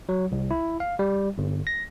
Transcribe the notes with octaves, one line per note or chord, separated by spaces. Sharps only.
F#3
C2
E4
F5
G3
G1
A#6